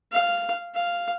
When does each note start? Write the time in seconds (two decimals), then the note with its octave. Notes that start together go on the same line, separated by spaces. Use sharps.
0.12 F5
0.75 F5